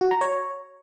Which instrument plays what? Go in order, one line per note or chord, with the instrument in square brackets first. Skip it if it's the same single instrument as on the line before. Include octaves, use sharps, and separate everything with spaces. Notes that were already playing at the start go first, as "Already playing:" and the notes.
[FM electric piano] F#4
A#5
C#5